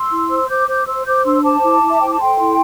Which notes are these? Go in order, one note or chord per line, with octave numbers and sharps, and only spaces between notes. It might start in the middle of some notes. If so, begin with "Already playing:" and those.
Already playing: C6 E6
E4
C5
C5 D6 G6
C5 D6 G6
C5 C6 E6
C5 D6 G6
D4 C6 E6
C5 A5 D6
E4
E4
E5
C5 G5
A5
A4 G5 C6
E4